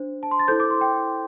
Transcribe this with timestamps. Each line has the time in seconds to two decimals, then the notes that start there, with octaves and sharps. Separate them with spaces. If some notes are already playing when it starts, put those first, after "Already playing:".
Already playing: D4 C5
0.23 A5
0.31 C6
0.39 A6
0.48 E4 A4 C5 G6
0.60 D6
0.71 C6
0.81 G5